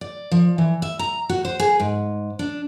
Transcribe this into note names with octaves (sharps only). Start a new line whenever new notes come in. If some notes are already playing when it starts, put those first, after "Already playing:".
D5
F3
E3
E5
A#5
F#4
C5
G#4
G#2
D4